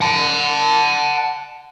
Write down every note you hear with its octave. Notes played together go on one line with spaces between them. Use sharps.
F#5 A5